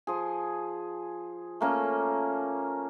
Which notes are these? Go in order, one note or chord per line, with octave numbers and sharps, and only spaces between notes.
F3 G#4
A3 A#3 C#4